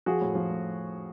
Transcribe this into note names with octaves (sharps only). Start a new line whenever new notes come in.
F3 F#4 G#4
A2
F3
A2